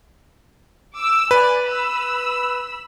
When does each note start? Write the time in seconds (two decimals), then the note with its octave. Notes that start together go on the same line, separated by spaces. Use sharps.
0.96 D6 E6
1.31 B4 D5 G#5
1.63 B5 E6